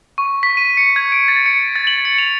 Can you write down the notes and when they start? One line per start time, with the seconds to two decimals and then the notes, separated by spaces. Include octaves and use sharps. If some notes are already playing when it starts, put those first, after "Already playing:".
0.18 C#6
0.43 B6
0.57 D#7
0.77 C#7
0.96 G#6
1.12 D7
1.28 A6
1.46 C#7
1.76 A6
1.87 F#7
2.05 C#7
2.18 F7